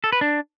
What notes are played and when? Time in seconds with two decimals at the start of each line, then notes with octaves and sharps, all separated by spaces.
0.04 A4
0.12 B4
0.21 D4